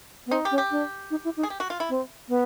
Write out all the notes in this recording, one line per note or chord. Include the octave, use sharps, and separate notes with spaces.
B3
C4 D#4
G4
C#4
G4
D4
D#4
E4
D#4
G#4
G4
F#4
F4
E4
C4
B3